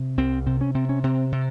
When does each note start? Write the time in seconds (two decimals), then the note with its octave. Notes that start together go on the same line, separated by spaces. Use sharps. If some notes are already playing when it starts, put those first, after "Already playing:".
Already playing: C3
0.17 C2 C4
0.46 C3 C4
0.61 C#4
0.75 C3 C4
0.89 C#4
1.04 C3 C4
1.32 C3